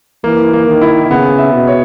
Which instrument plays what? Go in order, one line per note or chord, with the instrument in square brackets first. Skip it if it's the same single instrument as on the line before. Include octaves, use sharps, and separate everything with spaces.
[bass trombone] E3 [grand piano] A#3
[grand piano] A#3
[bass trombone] D#3
[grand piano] E4
[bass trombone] C#3 [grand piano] B3
[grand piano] E5
[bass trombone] B2
[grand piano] C#5